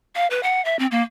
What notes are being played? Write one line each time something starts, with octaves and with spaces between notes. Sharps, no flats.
F5
B4
F#5
E5
C4
A#3